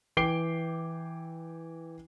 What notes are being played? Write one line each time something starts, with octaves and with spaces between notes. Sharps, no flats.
E3 G5 D6 C7 D7 G7